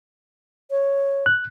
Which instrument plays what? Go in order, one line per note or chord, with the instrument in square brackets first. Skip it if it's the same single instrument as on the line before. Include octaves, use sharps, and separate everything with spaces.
[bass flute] C#5
[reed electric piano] F#6